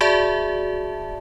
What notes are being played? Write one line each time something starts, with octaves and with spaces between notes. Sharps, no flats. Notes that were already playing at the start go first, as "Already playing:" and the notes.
F#4 G#4 D5 E5 A5